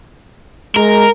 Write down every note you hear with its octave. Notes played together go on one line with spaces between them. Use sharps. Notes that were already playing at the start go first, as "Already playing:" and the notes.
G#3 A#4